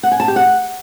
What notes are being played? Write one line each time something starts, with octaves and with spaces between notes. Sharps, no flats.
F#5
G#5
A5
G4
F#5